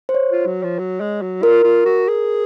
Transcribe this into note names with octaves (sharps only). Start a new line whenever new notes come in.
C5
C#5
F4
F#3
F3
F#3
G#3
F#3
F4 A#4
F4
F#4
G#4